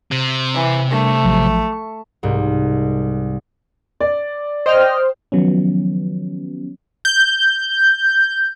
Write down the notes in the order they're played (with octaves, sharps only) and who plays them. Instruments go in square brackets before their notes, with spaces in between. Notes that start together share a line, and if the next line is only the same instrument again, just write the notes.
[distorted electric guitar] C3
[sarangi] E3
[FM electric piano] G3 D4 A#4 [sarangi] A3
[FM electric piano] A1 F3 F#3
C#6
[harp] C2 G#2
[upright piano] D5
[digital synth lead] C5 [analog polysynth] D#5 G5 F6
[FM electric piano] D#3 F3 F#3 B3 C#4
[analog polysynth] G6